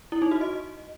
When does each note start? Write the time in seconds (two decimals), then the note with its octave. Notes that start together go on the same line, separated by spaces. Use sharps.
0.12 E4
0.22 D#4
0.31 F#4
0.41 D#5